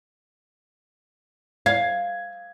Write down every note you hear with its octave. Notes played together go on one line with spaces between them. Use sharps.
F5 G#6